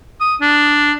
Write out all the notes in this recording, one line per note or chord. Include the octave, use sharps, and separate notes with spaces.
D#6
D4